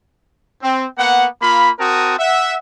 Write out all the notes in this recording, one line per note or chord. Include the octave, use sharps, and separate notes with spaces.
C4
A#3 B3 F#5
A#3 F4 B5
C4 F#4 A#4 A5 D#6
E5 F#5